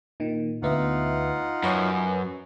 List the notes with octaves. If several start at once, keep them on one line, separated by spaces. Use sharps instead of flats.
A#2 D#3
D2 B3 D#4 F4 E5 F#5
F#2 B4 C#5